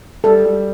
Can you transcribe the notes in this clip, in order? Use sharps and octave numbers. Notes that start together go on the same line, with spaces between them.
G3 A4
G3